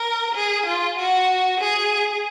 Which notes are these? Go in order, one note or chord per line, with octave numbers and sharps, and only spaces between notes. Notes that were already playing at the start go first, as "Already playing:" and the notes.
Already playing: A#4
G#4
F4
F#4
G#4